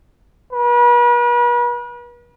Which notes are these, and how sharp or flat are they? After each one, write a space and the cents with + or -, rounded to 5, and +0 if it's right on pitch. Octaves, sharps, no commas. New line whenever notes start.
B4 -40